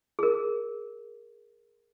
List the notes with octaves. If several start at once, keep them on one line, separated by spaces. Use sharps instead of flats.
G#4 A#4